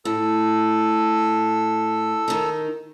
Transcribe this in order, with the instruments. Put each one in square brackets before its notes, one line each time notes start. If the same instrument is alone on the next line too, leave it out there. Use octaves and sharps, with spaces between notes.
[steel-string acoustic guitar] A2 [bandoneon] A4 E6
[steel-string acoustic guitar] D#3 D#4